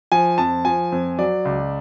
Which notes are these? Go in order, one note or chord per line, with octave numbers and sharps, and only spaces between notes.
F3 G#5
F2 A5
F3 G#5
F2
F#3 D5
C#2